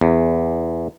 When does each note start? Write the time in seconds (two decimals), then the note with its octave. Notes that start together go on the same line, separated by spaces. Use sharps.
0.01 E2